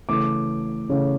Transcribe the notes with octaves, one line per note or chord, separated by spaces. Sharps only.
C#3 E3 A3 C#4 D6
C#3 E3 A3 C#4